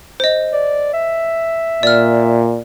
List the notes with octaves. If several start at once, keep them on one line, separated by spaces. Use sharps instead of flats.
C5 D#5
D5
E5
A#2 D5 F6